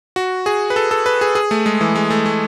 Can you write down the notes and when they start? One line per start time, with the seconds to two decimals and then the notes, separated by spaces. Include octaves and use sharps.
0.16 F#4
0.46 G#4
0.70 B4
0.76 A4
0.91 A4
1.06 B4
1.21 G#4
1.35 G#4
1.51 A3
1.66 G#3
1.81 E3
1.96 G#3
2.10 A3
2.26 A3